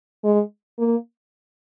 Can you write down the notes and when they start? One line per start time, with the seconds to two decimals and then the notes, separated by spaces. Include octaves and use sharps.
0.24 G#3
0.79 A#3